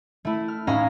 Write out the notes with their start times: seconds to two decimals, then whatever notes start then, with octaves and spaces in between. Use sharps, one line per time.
0.25 A3 E4
0.48 F6
0.67 A2 C#4 D#4 E4 F5 A#5